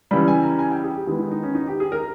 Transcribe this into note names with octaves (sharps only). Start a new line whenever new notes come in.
C#3 E3 G3 B5
G#5
A#5
G#5
G5
G#4
G4
D#3 G#3 B3 E4
D#4
D#4
C#4
D#4
G4
G#4
A#4